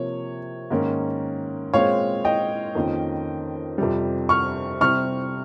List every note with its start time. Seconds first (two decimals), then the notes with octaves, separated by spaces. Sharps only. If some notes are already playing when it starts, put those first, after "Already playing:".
Already playing: C3 F3 A#3 C#5
0.70 G#2 D#3 A#3 C#4
1.74 A#2 G#3 C4 C#5 F5
2.25 D#5 G5
2.75 F2 D#3 A#3 C#4
3.78 F2 C3 G3
4.29 C#6 F6
4.81 C3 G3 C4 C#6 F6